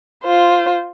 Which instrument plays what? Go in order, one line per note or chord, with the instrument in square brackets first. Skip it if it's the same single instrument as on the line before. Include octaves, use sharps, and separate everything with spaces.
[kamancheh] F4 C5